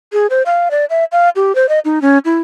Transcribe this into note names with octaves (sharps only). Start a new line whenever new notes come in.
G#4
C5
F5
D5
E5
F5
G4
C5
D#5
D#4
C#4
E4